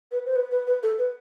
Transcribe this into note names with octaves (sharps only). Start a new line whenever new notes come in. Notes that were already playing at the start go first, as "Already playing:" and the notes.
B4
C5
B4
B4
B4
A4
B4